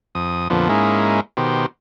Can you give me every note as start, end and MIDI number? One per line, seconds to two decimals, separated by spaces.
0.15 0.48 41
0.15 0.48 87
0.50 0.68 41
0.50 0.68 46
0.50 0.68 50
0.50 0.68 53
0.50 0.68 59
0.69 1.20 44
0.69 1.20 56
0.69 1.20 58
0.69 1.20 61
0.69 1.20 63
0.69 1.20 64
1.37 1.66 47
1.37 1.66 51
1.37 1.66 67
1.37 1.66 72